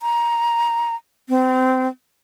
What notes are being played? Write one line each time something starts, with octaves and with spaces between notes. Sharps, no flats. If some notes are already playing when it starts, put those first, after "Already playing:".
A#5
C4